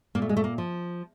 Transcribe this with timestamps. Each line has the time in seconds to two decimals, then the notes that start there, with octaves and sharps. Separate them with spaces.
0.15 A#2 A#3
0.22 A3
0.29 G#3
0.37 A3
0.44 A#3
0.58 F3